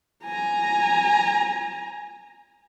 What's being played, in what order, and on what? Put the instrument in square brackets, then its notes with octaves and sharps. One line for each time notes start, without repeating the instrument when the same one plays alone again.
[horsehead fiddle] G#5 A#5